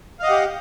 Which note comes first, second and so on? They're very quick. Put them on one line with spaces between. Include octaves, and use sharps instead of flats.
F5 D#5 F#5 G4